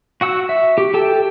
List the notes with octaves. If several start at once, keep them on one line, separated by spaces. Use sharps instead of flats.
F#4 F#5 E6
E5
G4
G4 A4 G5